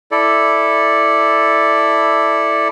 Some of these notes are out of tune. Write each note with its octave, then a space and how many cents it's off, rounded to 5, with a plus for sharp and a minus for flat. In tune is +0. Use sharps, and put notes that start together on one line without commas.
E4 +0 A4 +0 D5 +0